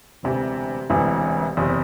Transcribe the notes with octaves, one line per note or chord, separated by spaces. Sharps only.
E1 D2 C3 E3
E1 D2 C3 E3
F#1 E2 C3